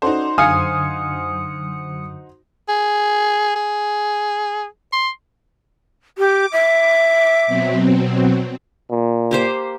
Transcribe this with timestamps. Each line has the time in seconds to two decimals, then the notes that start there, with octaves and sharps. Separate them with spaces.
0.02 C#4 D#4 F#4 A4 C5 D5
0.38 F#2 D3 F#3 F5 G#5 D#6 C#7
2.69 G#4
3.56 G#4
4.93 C6
6.18 G4 D6
6.52 E5
7.47 B2 F#3 C4
8.91 A#2
9.31 A#3 G4 C5